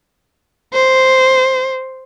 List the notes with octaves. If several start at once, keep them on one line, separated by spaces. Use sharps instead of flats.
C5